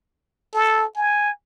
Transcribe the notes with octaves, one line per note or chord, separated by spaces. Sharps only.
A4
G#5